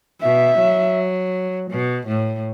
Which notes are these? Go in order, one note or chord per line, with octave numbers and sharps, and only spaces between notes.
B2 E5
F#3
B2
A2